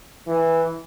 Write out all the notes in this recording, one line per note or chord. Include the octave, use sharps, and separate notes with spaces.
E3